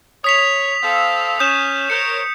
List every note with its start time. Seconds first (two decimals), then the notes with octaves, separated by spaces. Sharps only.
0.24 C#5 D#6 B6 F7
0.83 C4 A4 F5
1.39 C#4 D#6 G6 E7
1.90 A#4 C5 C#5 C#7